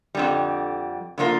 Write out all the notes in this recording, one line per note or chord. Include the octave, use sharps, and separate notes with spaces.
F2 D3 G3
D3 F3 A#3 F4